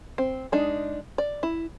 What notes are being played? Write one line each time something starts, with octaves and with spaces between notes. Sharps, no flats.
C4
G#3 D4 D#4
D5
E4